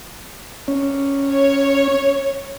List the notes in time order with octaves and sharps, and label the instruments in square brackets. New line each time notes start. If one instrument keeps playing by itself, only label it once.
[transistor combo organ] C#4
[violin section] C#5